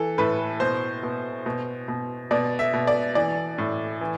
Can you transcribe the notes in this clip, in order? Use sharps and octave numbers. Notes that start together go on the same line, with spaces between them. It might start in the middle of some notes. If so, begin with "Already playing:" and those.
Already playing: E3 A4
A2 B4
B2 C5
B2
B2
B2
B2 D5
E5
B2
D5
E3 D5
A2
E3